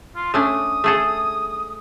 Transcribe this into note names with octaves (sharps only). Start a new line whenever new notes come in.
F4
A3 C#4 D4 D#6
A3 G#4 A4